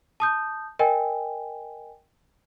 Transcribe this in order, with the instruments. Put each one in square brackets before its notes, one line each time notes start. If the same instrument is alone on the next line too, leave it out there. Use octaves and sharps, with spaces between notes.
[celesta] A5 D#6 G6
A#4 D#5 G5 G#5